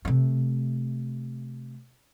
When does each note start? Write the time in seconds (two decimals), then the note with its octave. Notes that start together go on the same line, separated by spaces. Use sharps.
0.05 C3 A3